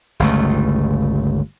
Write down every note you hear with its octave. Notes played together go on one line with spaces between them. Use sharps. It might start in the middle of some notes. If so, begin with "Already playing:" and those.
G1 C#2 A3